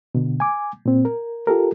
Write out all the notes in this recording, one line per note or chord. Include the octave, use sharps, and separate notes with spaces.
B2 D3
G#5 D6
A#2 C4
A#4
F4 G4 A4 A#4